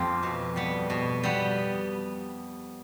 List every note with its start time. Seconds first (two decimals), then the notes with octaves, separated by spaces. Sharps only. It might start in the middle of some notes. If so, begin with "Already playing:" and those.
Already playing: F2 F3 C4 G4
0.23 B2
0.56 G3 B3
0.90 B2
1.24 G3 B3